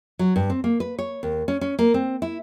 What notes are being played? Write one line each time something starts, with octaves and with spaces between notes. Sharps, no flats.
F#3
G2
C4
A#3
B4
C#5
D#2
C#4
C#4
A#3
C4
E4